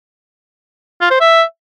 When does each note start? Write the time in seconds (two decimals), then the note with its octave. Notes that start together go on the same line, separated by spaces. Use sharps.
1.01 F4
1.11 C5
1.20 E5